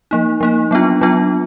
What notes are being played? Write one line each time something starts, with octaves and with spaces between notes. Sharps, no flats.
F3 A#3 D#4
F3 A#3 D#4
F#3 B3 D4 F4
F#3 B3 D4 F4